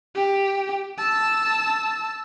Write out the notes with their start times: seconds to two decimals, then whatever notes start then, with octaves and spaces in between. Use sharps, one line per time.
0.15 G4
0.98 A5 E6